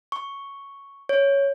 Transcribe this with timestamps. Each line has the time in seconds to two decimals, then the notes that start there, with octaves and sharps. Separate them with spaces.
0.12 C#6
1.09 C#5